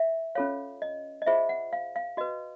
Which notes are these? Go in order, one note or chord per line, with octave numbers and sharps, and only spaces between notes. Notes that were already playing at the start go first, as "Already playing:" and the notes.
Already playing: E5
C#4 F4 A4 C#5 F5
D#5
D#5
F4 G#4 C5 E5
F#5
F5
F5
F#4 B4 D#5